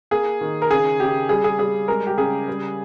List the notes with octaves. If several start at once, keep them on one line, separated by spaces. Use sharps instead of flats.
A#3 G#4
D#3
A#4
C#3 G#4
C#3 G4
G3 G#4
G#4
G3 G#4
G#3 A#4
G4
C#3 G#4
G3